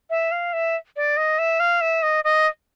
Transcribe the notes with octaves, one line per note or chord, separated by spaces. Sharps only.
E5
F5
E5
D5
D#5
E5
F5
E5
D#5
D#5